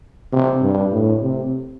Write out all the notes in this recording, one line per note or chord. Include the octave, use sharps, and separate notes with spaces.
C3
G2
A2
C3